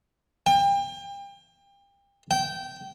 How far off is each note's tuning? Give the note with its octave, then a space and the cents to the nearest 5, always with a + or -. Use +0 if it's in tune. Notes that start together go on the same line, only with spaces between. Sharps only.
G5 +30
G5 -20